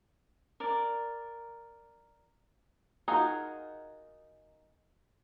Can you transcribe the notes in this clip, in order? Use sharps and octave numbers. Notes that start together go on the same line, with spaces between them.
A#4 D5
D#4 F4 F#4 G#4 A#4